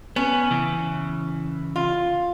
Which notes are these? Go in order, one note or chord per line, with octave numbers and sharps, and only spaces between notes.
B3 C#4
C#3 E3
F4